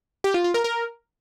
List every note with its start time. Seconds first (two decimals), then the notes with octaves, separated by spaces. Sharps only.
0.24 G4
0.34 F4
0.44 F4
0.54 A#4
0.64 A#4